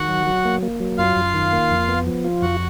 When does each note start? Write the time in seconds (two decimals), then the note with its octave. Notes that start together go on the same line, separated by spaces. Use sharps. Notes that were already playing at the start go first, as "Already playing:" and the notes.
Already playing: D#3 F#4 F#5
0.08 F#3
0.26 F#3
0.45 A#3
0.62 A#3
0.80 F#3
0.98 F#2 F4 F5
1.16 F#2
1.34 D#3
1.53 A#3
1.71 F2
1.88 B3
2.06 F3
2.24 F4
2.42 F2 F#4 F#5